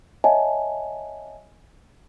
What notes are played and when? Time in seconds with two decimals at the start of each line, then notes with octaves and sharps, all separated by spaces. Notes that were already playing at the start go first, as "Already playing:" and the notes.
0.24 C#5 D#5 E5 F#5 G#5 A5